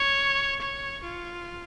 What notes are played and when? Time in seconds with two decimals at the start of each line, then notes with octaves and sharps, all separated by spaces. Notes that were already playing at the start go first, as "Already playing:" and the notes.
Already playing: C#5
0.61 C#5
1.04 F4